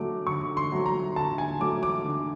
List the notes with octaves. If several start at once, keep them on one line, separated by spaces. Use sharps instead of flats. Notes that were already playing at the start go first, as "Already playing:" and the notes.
Already playing: D3 F#3 A3 D6
D3 C#6
C6
F#3 A3
A#5
D3 A5
G#5
F#3 A3 D6
D6
D3